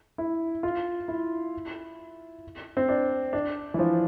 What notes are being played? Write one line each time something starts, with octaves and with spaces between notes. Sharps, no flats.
E4
F4
E4
C4
D4
D4
E3
F3